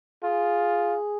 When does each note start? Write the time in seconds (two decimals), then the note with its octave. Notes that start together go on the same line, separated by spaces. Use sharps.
0.24 F4 G#4